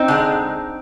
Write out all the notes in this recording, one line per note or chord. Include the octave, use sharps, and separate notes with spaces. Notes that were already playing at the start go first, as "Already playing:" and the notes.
Already playing: C4 D#4
D3 G#3